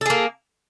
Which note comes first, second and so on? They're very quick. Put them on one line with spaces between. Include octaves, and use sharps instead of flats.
A4 G#4 A#3